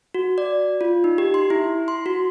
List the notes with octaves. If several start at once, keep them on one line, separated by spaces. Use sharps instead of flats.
F#4
D5
F4
D#4
G4
C6
E4
C6
F#4